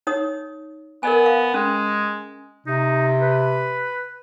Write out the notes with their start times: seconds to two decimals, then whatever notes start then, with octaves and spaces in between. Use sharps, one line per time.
0.07 D#4 C#5 D#6
1.03 B3 A#4 D#5 G#5
1.26 F5
1.54 G#3 C#4
2.67 C3 D#4
3.21 B4